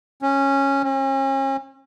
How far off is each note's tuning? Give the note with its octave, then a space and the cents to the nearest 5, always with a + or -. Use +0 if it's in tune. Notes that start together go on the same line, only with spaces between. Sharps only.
C#4 -10
C#4 -40